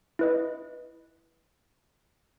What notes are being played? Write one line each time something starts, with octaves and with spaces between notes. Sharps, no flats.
E4 B4 D#5